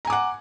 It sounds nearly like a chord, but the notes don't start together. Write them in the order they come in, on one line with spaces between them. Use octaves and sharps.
A#5 G#5 D6 F#5